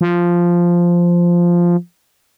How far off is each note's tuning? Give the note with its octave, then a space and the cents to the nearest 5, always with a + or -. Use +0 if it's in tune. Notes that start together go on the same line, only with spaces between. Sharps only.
F3 -5